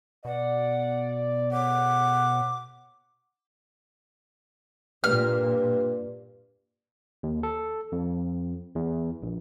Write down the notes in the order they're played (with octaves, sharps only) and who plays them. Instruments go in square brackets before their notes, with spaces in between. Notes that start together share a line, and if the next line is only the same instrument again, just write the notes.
[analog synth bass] B2 [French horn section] D5 [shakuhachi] F#5
[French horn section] G#4 A4 C#5 [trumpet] F#5 [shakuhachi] D6
[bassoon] G2 [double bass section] A#2 [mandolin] F6
[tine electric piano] D#2
A4
F2
E2
A#1